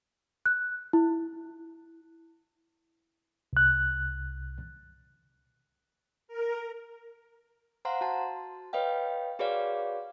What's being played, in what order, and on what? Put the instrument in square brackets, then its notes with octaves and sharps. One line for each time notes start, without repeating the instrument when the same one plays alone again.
[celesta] F#6
E4
[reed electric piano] C2 F#6
[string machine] A#4
[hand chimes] C5 F5 F#5 A#5 C6
F#4 A5
B4 C#5 D#5 F5 G5
F#4 G#4 B4 C#5 D5 F5